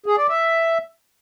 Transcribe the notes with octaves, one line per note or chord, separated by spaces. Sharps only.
G#4
D5
E5